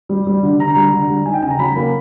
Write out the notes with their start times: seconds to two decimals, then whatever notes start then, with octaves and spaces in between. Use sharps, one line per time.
0.09 G3
0.27 G3
0.43 D3
0.60 D3 A#5
0.76 G3
0.93 D3
1.09 G3
1.26 D#4 G#5
1.34 G5
1.43 C#3 G#5
1.50 A#5
1.59 F#3 B5
1.76 A#3